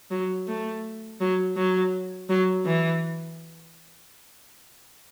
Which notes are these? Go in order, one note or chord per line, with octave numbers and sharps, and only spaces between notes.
F#3
A3
F#3
F#3
F#3
E3